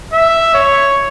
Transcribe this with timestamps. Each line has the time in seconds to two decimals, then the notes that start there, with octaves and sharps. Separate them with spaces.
0.13 E5
0.54 C#5